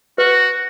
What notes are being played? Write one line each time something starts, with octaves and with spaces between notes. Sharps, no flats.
F#4 B4